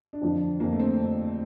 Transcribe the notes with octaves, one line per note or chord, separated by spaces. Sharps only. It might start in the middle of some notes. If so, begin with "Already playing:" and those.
D4
F2 D3 F3
F2 D3 F3 A#3
A3
C4